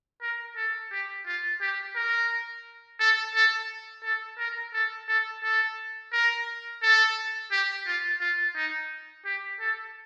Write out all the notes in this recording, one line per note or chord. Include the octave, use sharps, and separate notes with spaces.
A#4
A4
G4
F4
G4
A#4
A4
A4
A4
A#4
A4
A4
A4
A#4
A4
G4
F4
F4
D#4
G4
A4